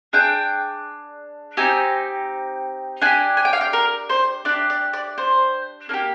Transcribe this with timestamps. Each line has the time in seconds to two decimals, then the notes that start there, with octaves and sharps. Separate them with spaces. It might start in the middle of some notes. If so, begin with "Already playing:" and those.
0.13 D4 G#4 G5
1.57 C4 D#4 G4 G#5
3.02 D4 G4 G#5
3.37 G#5
3.45 G5
3.53 F5
3.61 G5
3.73 A#4
4.09 C5
4.45 D4 G4 D5
4.70 D5
4.93 D5
5.18 C5
5.89 A#3 D4
5.94 G4